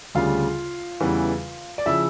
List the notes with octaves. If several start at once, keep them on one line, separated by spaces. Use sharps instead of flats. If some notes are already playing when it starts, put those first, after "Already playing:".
D2 C#3 G3 F4 F5
E2 C#3 E3 G3
D5
C#3 F3 E4 E5